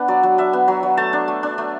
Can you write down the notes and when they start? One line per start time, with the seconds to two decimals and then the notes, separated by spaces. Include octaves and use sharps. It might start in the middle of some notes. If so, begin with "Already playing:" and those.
Already playing: B3 D4
0.08 F#3 D5
0.23 F#3
0.38 D4 E5
0.53 B3
0.68 F#3
0.83 F#3
0.97 A3 A5
1.13 D4
1.28 A3
1.43 D4
1.58 A3